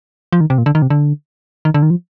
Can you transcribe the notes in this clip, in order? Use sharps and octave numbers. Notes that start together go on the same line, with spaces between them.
F3
D#3
C3
A#2
D3
D#3
C3
D3
D#3
D3
D#3
F3